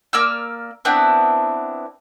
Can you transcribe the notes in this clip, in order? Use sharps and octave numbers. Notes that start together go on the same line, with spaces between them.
A#3 D5 E6 F6
B3 C4 D4 E4